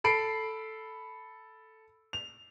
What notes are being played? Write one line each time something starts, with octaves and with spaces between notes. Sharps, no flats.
A4 B5 C7 D7
F7